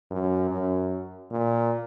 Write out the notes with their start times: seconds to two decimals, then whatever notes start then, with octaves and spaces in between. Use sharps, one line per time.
0.11 F#2
0.51 F#2
1.30 A#2